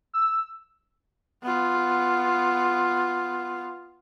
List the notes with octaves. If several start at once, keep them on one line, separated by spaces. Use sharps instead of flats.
E6
B3 F4